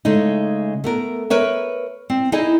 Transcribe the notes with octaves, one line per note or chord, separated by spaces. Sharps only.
C#3 G#3 A3 D#4
A3 B3 A#4
A#4 B4 C#5 E5
C4
D#4 E4 G#4 D#5 G#5